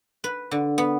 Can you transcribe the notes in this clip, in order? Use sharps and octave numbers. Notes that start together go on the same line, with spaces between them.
B4
D3
B3